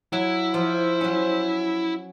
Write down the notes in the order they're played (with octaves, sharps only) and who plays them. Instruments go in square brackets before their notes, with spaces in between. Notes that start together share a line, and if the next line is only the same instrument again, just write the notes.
[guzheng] F#3 [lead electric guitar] E4
[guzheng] F3 [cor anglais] C5
[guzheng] F#3 C#4